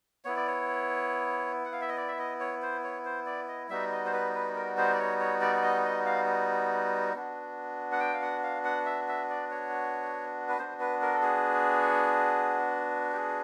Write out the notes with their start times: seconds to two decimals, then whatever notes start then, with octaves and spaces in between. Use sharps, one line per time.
0.25 B3 E4 C#5
0.36 D5
0.47 C#5
1.65 F#5
1.73 F5
1.81 E5
1.89 D#5
1.97 D5
2.08 E5
2.19 D#5
2.40 C#5
2.62 C5
2.84 C#5
3.05 C5
3.26 D5
3.48 D#5
3.69 G3 B3 D#4 F#4 E5
3.92 D#5
4.05 C5
4.13 B4
4.34 B4
4.56 A#4
4.77 C5
4.94 D5
4.99 C#5
5.20 C#5
5.41 D5
5.57 D5
5.63 D#5
5.85 D#5
6.06 F5
7.14 B3 D4 F#4
7.92 F#5
8.00 G5
8.13 F5
8.22 F#5
8.43 F5
8.64 F#5
8.86 E5
9.08 E5
9.30 D5
9.51 C#5
10.49 B4
10.58 B3 D4 F#4 C5
10.80 B4
11.02 A#4
11.14 A4
11.23 G#4
13.12 G4
13.17 G#4